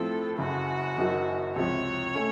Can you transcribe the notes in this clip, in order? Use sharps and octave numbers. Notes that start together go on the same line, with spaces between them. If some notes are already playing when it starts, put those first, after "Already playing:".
Already playing: A2 F3 C4 A4
F#1 F#2 C#3 F#4
F#1 F#2 D#3 F#3
C#2 C3 F3 C#5
A3 C#4